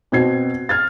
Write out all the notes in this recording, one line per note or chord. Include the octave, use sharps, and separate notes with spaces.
B2 C4 G#6 C7
F6 G#6 A6